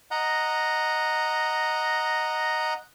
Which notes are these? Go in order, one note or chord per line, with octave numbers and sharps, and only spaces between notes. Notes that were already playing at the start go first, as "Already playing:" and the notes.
D#5 F#5 A#5